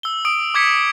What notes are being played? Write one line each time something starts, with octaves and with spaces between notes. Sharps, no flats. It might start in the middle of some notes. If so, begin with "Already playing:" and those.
E6 G7
D#6 D7
D6 E6 G#6 B6 C#7